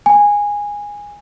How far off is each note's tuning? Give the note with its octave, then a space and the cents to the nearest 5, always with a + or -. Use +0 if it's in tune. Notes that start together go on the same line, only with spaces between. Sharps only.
G#5 -15